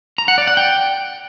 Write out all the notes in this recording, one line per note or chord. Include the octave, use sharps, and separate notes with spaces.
A#5
F#5
D5
F#5
G5